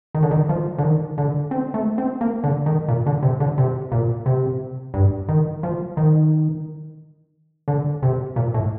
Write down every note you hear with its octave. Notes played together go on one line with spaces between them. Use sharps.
D#3
D3
D#3
F3
D3
D#3
D3
C4
A3
C4
A#3
D3
D#3
A#2
D3
C3
D3
C3
A#2
C3
G2
D#3
F3
D#3
D3
C3
A#2
A2